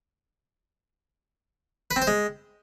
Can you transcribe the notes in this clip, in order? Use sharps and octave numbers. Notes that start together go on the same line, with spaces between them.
B4
C4
C5
G#3